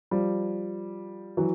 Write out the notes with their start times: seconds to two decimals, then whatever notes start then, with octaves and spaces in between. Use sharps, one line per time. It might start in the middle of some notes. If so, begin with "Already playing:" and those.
0.11 F3 G3
1.37 E3 F#3